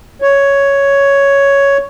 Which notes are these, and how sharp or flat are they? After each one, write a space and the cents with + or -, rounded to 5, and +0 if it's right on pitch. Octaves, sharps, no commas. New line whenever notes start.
C#5 +5